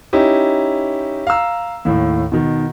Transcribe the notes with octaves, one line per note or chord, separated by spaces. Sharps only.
C#4 D#4 E4 G4
F5 A#5 E6
D#2 A2
B2 D#3